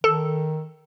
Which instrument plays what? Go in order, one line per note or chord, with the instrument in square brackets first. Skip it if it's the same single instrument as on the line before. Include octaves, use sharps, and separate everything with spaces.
[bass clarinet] D#3 [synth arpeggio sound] A4